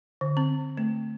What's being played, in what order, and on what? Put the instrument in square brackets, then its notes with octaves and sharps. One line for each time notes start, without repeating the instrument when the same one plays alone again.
[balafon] D3
C4
A3